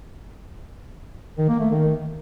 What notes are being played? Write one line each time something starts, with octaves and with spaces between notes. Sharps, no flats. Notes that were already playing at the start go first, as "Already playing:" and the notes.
D#3
A#3
A3
D#3